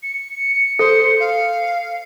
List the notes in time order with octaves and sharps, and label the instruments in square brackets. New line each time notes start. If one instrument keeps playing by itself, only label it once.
[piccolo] C#7
[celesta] A4 [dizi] C5
[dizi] F5